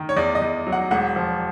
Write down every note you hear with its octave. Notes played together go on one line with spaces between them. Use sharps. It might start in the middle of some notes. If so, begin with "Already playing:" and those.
Already playing: D#3
C#5
E2 D5
D#5
E2
F#3
F#5
E1 F#5
F3